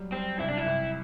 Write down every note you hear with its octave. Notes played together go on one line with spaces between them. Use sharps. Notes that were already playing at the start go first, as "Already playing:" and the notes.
Already playing: F#3 G3
G3 C4
C2 E4
D4
E4
C2